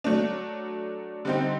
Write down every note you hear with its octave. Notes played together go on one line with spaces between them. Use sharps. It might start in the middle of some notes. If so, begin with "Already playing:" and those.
F#3 A3 D4
D3 G3 C4 D#4 G4